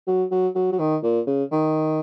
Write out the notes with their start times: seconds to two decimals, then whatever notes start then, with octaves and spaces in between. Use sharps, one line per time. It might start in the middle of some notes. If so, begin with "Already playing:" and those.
0.07 F#3
0.31 F#3
0.55 F#3
0.72 F#3
0.79 D#3
1.03 A#2
1.27 C#3
1.51 D#3